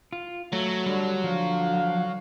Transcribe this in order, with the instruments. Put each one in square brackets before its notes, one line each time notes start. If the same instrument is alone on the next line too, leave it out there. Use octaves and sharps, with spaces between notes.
[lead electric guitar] F4
[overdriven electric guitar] F#3 [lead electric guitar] A3
[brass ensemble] D3 [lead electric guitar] G3
[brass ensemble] D3 F5 [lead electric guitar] F3